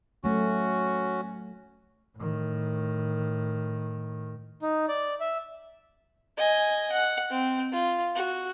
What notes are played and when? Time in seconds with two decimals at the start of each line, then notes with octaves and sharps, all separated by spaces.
0.24 F#3 A3 C#4 F#4
2.17 A2 D#3
4.62 D#4
4.88 D5
5.20 E5
6.37 D#5 G#5
6.92 F#5
7.31 C4
7.72 F4
8.15 F#4